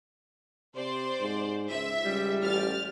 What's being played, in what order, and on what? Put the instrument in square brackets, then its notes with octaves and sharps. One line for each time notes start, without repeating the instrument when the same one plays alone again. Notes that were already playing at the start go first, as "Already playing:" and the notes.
[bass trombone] C3 [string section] C5 D5 C6
[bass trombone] G#2
[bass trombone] C#2 [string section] E5
[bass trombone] C#2 [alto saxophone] G3
[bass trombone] A1 [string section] F6 A6